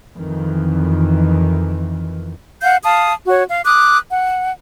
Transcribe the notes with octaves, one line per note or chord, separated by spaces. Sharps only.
F2 D#3 E3
F5 F#5 G6
F5 A5 D#6
F#4 C#5
F5
D6 D#6 F#6
F#5